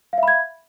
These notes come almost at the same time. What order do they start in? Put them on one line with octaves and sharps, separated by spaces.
F5 E5 B5 G#6